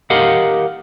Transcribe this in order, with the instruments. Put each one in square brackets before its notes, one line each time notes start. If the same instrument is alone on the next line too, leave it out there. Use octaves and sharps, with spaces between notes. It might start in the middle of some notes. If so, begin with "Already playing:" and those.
[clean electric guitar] G4 A#4 D#5 F5 F#5